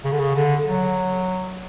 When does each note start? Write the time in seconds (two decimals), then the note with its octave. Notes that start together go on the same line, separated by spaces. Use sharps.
0.04 C#3
0.12 D3
0.19 C#3
0.35 D3
0.67 F#3